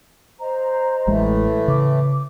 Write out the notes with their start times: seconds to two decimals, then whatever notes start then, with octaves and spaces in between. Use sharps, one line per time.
0.40 C5 D#5 A#5
1.07 A1 A2 E3 G#3 A3
1.68 C#3 D6